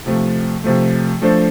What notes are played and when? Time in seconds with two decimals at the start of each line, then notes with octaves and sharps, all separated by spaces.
0.06 C3 F3 A3
0.64 C3 F3 A3
1.22 F3 A3 D4 A4 C5